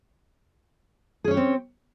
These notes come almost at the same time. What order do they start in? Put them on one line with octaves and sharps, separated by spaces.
G#4 C#4 C#5 G4 C4